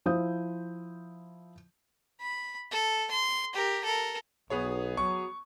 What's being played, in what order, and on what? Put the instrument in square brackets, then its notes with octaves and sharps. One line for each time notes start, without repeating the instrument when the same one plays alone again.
[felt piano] F3 E4 C5 D#6 G6
[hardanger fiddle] B5
A4
C6
G4 A#4
A4 A#4
[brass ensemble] B1 [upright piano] B3 G#4 C#5
[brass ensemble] F#3 [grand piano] C#6